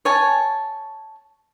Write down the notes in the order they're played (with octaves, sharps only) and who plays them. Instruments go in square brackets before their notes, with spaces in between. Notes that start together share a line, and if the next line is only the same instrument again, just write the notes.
[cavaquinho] C#5 G#5 A5